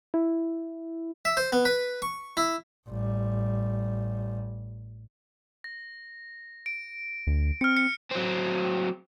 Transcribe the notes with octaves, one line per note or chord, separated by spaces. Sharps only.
E4
E5
C5
B3
B4
C#6
E4
A1 G3
A#6
D7
D2
C4 F6 C#7
C#7
F#3 C4